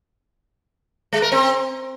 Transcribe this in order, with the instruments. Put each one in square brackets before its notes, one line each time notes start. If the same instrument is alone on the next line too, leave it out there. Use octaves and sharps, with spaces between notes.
[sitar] G#3
A#4
C4